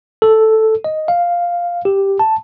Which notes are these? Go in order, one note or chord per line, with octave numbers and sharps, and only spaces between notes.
A4
D#5
F5
G4
A5